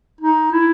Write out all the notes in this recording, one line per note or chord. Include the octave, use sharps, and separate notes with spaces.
D#4
E4